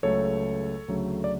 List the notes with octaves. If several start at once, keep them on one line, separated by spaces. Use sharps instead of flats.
C#2 C#3 F#3 A3 A4 C#5
D2 C#3 F#3 A3
D5